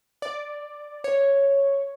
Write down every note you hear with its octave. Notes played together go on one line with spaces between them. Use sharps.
D5
C#5